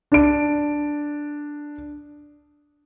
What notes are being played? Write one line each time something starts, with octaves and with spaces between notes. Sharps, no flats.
D4 D7